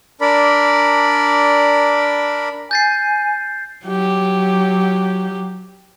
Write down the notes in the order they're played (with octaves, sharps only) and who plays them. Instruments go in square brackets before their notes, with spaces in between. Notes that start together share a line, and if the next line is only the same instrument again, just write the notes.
[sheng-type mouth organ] D4 A#4 D5 B5
[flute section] G#5 [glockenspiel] G6 A6 C7
[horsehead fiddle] F#3 G4